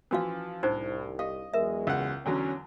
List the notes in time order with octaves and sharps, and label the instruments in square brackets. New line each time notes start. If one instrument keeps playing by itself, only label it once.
[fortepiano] E3 F3 [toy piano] C#4 F#4 F5
[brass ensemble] C2 [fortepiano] A2 [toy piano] D4 D#4 C5
[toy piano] G4 F5 [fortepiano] D#5
[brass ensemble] E2 F#3 G#3 [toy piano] A#4 E5
[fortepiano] C#2 F#5
[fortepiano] E2 D3 F#3 [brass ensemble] C#4